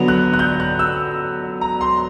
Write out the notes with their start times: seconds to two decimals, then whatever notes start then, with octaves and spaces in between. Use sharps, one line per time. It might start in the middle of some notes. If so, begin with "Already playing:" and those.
Already playing: D3 F#3 B3
0.08 F#6
0.33 F#6
0.39 G6
0.60 F#6
0.79 E6
1.61 A#5
1.81 C6